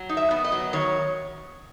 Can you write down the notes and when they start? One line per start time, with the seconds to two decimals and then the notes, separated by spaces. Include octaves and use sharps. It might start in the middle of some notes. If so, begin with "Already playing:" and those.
Already playing: F#3
0.09 D#4
0.17 E5
0.31 B3
0.44 D#5
0.52 F#3
0.73 D#3 C#5